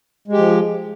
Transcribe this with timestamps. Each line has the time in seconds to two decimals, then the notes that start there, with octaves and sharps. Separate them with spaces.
0.28 G#3
0.33 G4
0.37 F3